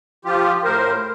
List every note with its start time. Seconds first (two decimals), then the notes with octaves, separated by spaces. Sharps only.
0.25 F3 F4 G4
0.64 A2 A#4 C5